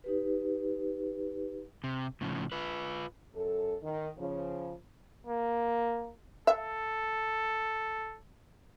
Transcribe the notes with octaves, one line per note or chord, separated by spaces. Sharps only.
D#4 G4 B4
C3
A2 C#3 F3
F4 B4
F#2 A4
D#3
C#3 F3
A#3
A4 E5